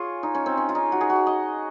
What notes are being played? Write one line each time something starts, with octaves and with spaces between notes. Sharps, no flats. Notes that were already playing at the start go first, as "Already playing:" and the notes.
Already playing: F4 G#4 C#5
D#4
C#4
C4
C#4
F4
D#4
F#4
G#4
F#4
D#5